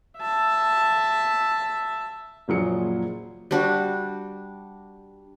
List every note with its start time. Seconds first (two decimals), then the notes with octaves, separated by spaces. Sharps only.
0.18 E5 A5
2.48 F#1 A#2 F3 F#3 G#4 C#7
3.51 G3 D4 F#4